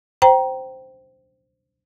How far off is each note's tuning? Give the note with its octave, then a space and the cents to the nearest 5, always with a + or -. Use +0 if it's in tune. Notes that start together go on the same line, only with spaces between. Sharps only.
C5 -5 G5 -15 A#5 +20